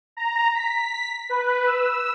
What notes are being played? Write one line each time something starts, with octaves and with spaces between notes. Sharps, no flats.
A#5
B6
B4
E6